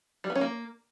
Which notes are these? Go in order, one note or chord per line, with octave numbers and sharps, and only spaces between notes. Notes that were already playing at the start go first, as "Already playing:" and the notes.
G3
B3
C#4
A#3